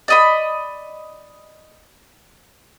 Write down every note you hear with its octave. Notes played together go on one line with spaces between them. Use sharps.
D5 D#5 B5